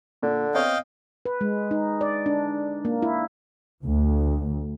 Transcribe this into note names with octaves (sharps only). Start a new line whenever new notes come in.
A#2 D3
B3 C4 C#5 D#5 F5 G5
B4
G#3
D#4
D5
D4
A#3
E4
D2